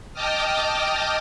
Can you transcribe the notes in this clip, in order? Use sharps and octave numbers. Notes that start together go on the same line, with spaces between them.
D#5 G5 A5 D6 D#6 F6